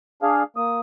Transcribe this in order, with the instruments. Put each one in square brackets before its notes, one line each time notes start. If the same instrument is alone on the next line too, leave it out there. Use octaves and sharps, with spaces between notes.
[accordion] D4 G#4 F5
A#3 D#6